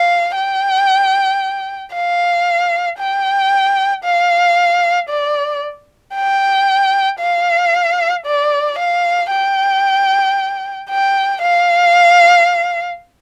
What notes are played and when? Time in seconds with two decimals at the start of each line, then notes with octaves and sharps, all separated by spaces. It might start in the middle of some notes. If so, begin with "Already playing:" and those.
Already playing: F5
0.36 G5
1.94 F5
2.99 G5
4.04 F5
5.09 D5
6.15 G5
7.20 F5
8.26 D5
8.79 F5
9.31 G5
10.90 G5
11.41 F5